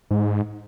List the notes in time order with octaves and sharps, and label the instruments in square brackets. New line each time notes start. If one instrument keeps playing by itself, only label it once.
[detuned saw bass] G#2